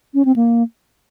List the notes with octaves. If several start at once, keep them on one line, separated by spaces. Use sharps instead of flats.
C#4
C4
A#3